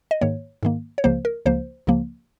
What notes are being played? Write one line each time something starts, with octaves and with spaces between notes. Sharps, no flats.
D#5
G#2 D#3 A#3 C#5
G#2 D#3 A#3
C#5
C#2 C#3 F3 A#3 C5
A#4
C#2 C#3 F3 A#3 C5
C#2 C#3 F3 A#3